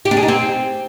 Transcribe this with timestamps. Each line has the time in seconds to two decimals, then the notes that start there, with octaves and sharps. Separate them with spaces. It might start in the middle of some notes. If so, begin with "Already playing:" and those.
0.05 G4
0.11 D4
0.17 G#4
0.23 D#4
0.28 C4